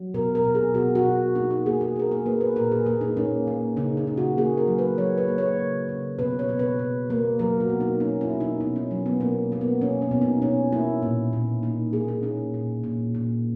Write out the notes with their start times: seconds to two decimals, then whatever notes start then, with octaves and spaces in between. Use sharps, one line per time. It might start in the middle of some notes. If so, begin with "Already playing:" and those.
Already playing: F#3
0.14 B2 A#4
0.35 A#4
0.45 B2
0.55 G#4
0.74 B2 F#4
0.95 F#4
1.05 B2
1.35 A#3 D#4
1.51 F#4
1.66 A#3 G#4
1.81 G#4
1.96 A#3 A#4
2.11 G#4
2.26 A#3 B4
2.41 B4
2.56 A#2 A#4
2.72 G#4
2.86 A#3 G#4
3.01 D#4
3.17 A#3 C#4
3.47 A#3
3.77 C#3 D#4
3.97 D#4
4.07 C#3
4.17 F#4
4.37 A#3 G#4
4.57 A#4
4.68 F#3
4.78 B4
4.98 F#3 C#5
5.18 B4
5.28 A#3
5.38 C#5
5.58 C#3
5.89 C#3
6.19 B2 B4
6.39 C#5
6.49 B2
6.59 B4
6.79 B2
7.10 A#3
7.39 F#3 A#4
7.60 F#4
7.69 B2
7.80 D#4
8.00 A#3 C#4
8.21 E4
8.30 B2
8.41 D#4
8.61 B2 D#4
8.76 C#4
8.91 F#3 B3
9.06 B3
9.21 B2 A#3
9.52 A#3
9.61 B3
9.81 B2 C#4
10.01 C#4
10.11 B2
10.22 D#4
10.42 B2 C#4
10.72 A#3 E4
11.02 A#2
11.33 A#2
11.63 A#3 D#4
11.93 A#3 G#4
12.08 D#4
12.23 A#3 C#4
12.54 A#2
12.84 A#2
13.15 A#2